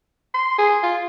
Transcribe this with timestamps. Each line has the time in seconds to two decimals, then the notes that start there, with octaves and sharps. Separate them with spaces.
0.34 C6
0.58 G#4
0.83 F4